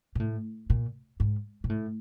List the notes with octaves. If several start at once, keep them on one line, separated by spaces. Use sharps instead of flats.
A#2
A2
A#2
G#2
A#2
A2